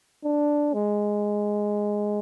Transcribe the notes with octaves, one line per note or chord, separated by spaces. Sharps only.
D4
G#3